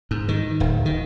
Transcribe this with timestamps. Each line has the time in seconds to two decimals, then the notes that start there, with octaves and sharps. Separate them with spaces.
0.11 G#2
0.28 D#3
0.60 D1
0.86 D#3